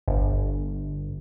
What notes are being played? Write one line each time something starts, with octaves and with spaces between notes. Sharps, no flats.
G1